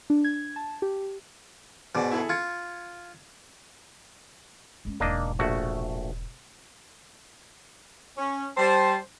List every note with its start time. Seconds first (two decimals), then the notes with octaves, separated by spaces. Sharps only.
0.10 D4
0.24 G#6
0.56 A5
0.82 G4
1.95 G#2 B2 D5 D6
2.11 E4 G#4 A4
2.29 F4 G#6 C#7
4.85 G#3 C#4
5.00 E1 G#2 A#3 D4 D#5
5.39 A#1 A3 F#4
8.18 C#4
8.57 G3 C5 A5